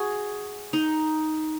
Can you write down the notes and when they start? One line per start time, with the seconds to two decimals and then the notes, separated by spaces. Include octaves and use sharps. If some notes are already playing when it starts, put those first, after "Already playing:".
Already playing: F#4 G#4
0.73 D#4